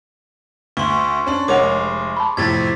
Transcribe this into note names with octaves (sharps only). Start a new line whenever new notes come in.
D2 C6 C#6
C#4 D4
F1 G#3 A#4 C#5 F#5 D6 F7
A5 B5
F2 A2 C3 G#6 A6 B6